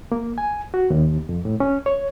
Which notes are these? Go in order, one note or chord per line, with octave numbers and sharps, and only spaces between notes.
A#3
G#5
F#4
D#2
F2
A2
C#4
C#5